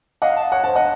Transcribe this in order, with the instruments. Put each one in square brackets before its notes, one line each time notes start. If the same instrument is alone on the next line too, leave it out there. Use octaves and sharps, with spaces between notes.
[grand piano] D#5 F#5 [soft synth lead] F5
[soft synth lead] A5
[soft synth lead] C#5 [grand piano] F#5
[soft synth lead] C5 [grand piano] A5
[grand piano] D#5 F#5